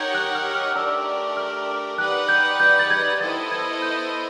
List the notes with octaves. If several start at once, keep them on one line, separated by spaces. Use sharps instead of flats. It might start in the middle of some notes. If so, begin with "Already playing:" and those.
Already playing: D#4 G4 A#4 C#5 F#5 G6 G#6
F#6
F6
F6
A3 D4 G4 A#4 D5 E6
F6
D#4 G4 B4 D5 F#5 F#6
G6
G6
A6
G#6
G#6
B3 E4 A4 C5 D#5 A6
G#6
G6